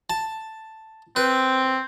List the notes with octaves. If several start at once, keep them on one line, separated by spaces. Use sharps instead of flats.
A5
C4 B4